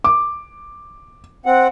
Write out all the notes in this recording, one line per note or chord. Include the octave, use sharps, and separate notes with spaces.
D6
C4 F#5